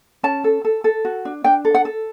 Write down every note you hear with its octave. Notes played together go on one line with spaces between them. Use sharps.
C#4 A5
A4
A4
A4
F#4
D4
D4 G5
A4
F#5
A4